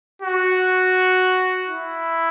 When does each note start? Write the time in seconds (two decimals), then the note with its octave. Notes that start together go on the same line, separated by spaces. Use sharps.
0.22 F#4
1.68 E4